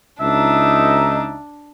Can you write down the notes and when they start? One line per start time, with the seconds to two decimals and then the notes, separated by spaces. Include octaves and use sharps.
0.20 C#2 D4 D#4 E5